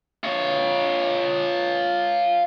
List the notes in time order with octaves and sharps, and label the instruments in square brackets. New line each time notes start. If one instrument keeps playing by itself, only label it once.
[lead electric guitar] F4 C#5